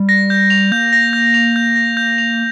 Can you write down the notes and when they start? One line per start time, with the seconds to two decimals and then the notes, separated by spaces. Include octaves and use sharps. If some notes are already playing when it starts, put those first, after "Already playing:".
Already playing: G3
0.09 A#6
0.30 G6
0.50 F7
0.72 A#3 G6
0.93 A#6
1.13 G6
1.34 F7
1.56 G6
1.76 A#6
1.97 G6
2.18 F7